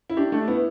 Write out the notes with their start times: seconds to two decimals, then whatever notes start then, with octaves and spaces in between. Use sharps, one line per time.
0.10 E4
0.17 D4 G4
0.32 A3 D4
0.47 B3 E4